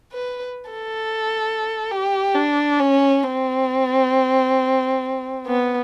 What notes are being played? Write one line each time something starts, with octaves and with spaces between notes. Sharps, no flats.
B4
A4
G4
D4
C#4
C4
B3